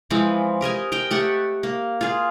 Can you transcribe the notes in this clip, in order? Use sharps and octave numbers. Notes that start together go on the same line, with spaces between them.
E3 F3 G#3 C4
G4 A#4 D#5 G#5
A#4 D#5 G5
A3 G4 F#5
A#3
F4 G#4